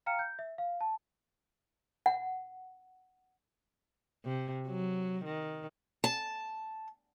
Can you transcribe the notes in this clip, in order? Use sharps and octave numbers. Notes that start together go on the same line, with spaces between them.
F5 G5 A#5 F6 C#7
G6
E5
F5
A5
F#5
C3
F#3
D#3
A5